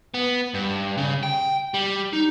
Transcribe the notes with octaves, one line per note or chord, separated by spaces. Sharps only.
B3
G2
C#3
G5
G3
D#4